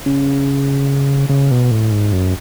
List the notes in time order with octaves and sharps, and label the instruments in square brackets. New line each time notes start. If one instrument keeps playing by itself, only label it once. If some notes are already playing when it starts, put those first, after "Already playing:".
[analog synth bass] C#3
C#3
B2
A2
G#2
F#2